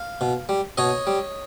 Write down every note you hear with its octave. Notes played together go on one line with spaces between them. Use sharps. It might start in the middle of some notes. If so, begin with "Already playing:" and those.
Already playing: F5
B2
G3
B2 C#5 D#5
G3